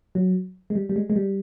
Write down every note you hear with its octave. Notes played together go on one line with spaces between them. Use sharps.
F#3
G#3
G3
G3
G#3
G#3
G3